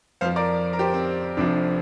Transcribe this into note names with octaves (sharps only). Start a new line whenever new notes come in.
F2 F3 C5 F5
A#4 D5
A#4
G4 C5
C4
F1 F2 C3 F3 D4